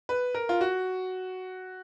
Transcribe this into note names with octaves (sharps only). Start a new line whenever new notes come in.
B4
A#4
F4
F#4